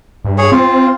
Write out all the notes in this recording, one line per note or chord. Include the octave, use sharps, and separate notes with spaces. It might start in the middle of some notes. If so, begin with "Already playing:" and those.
G2
G#4 C#5
C4 F4